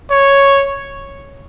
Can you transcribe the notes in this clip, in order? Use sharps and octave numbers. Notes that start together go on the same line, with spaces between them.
C#5